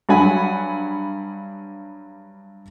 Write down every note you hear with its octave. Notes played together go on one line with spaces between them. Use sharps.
G2 F#3 F#5 G#5 B5